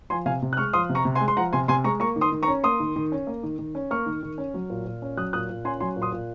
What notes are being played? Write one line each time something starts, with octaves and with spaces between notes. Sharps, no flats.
F3 G#5 C6
C3 F5 G#5
C3
F#6
G#3 C#6 F6
F3 C6 D#6
C3
A#5 C#6
C3
G#5 C6
G#3
C6
F3 F#5 A#5
C3 G#5 C6
C3 G#5 C6
G#3 A#5 C#6
A#3 A#5 C#6
D#3
C6 D#6
D#3
A#5 C#6
C#4
A#3 C6 D#6
D#3
D#3
C#4
A#3
D#3
D#3
C#4
A#3 C#6 F6
D#3
D#3
C#4
F#3
A#2
A#2
C#4
F#3 D#6 F#6
A#2 D#6 F#6
A#2
C#4 G#5 C6
F#3 G#5 C6
A#2
C6 D#6
A#2